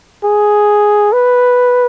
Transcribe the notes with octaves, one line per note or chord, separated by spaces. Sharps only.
G#4
B4